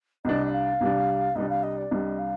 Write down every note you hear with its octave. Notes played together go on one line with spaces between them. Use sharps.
C2 C3 G3 D4 D#5
D#5
F5
C2 C3 G3 D4
C2 C3 G3 D4 D#5
F5
D#5
D5
C2 C3 G3 D4 D#5
F5